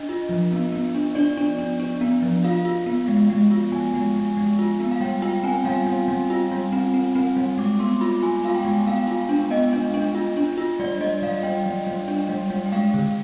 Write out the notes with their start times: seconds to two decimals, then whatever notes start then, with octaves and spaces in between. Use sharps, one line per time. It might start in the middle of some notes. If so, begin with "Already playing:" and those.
Already playing: D4 D#5
0.09 F4
0.29 F3
0.52 B3
0.72 B3
0.95 D4
1.15 D4 D5
1.37 D4
1.58 D4
1.80 D4
2.01 B3
2.22 F3
2.44 F4 F5
2.65 F4
2.86 B3
3.08 G#3
3.30 G#3
3.51 F4
3.72 G#3 G#5
3.94 G#3
4.16 G#3
4.37 G#3
4.59 F4
4.80 B3
4.91 F5
5.01 G3 G5
5.22 F4 G5
5.44 C4 G#5
5.65 G3 F5
5.87 G3
6.08 G3
6.30 F4
6.51 G3
6.72 C4
6.94 C4
7.15 C4
7.37 G3
7.58 G#3 D6
7.80 B3 C6
8.01 F4 B5
8.22 F4 G#5
8.44 F4 F5
8.55 G5
8.65 G#3
8.86 B3 F5
9.08 F4
9.29 D4
9.50 B3 D#5
9.73 D4
9.94 D4
10.15 F4
10.37 D4
10.58 F4
10.80 G3 D5
11.01 G3 D#5
11.22 G3 F5
11.43 G3 G5
11.66 G3
11.87 G3
12.08 D4
12.29 G3
12.50 G3
12.66 G5
12.72 G#3 F5
12.94 D3